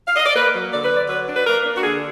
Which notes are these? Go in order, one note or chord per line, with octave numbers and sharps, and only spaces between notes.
F5
D#5
D5
A#3 B4
F#3
D3 D5
B4
D3
D5
F#3 B4
D4
B4
A#3 A#4
D4
F#4
D3 G#4